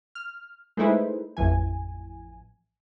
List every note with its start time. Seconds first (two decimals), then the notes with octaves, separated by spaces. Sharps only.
0.15 F6
0.77 G#3 A3 D#4 E4 B4 C5
1.37 A1 F2 E3 G#5